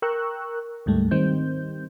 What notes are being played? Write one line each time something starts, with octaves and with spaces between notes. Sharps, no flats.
A#4 G5 C#6 E6 F#6
D2 G#2 G3 A3
D#3 G3 C4 G6